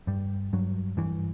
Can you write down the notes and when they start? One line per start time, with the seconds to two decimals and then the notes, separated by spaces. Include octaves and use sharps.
0.07 G2 G3
0.53 G2 F#3
0.97 G2 E3